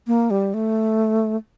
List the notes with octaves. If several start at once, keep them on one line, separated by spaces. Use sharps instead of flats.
A#3
G3
A3